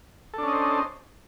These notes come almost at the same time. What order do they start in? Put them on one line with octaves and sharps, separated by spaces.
A4 D4 C#4 D#5 C5